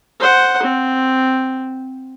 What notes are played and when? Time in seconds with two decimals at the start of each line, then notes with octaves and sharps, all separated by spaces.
0.21 C5 F#5
0.63 C4